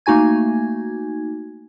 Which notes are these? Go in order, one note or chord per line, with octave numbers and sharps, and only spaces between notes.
A3 A#3 D#4 F#4 G#5 G#6